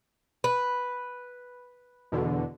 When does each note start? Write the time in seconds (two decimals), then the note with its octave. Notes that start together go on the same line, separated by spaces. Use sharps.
0.44 B4
2.12 E2 B2 D3